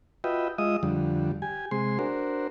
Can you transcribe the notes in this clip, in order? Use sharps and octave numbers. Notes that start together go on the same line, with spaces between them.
F4 F#4 B4 D#5 E5 G5
G#3 F4 D#5 E5 D#6
F2 D3 G3
G4 G#5
C3 G#3 G#4 C6
D4 F#4 A#4 C5